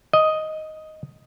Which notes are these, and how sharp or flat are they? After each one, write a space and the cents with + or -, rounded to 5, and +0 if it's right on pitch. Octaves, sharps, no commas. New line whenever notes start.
D#5 +5